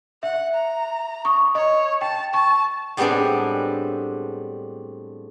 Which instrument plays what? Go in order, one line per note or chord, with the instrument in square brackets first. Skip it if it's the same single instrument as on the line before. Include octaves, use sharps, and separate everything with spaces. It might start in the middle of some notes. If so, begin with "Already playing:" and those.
[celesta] E5 [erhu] F#5
[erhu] A#5
[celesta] C#6 D#6
[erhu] C#5 [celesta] D#5
[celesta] G5 [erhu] A5
[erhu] A5 [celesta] C#6
[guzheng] A2 G3 G#3 B3 C4 D4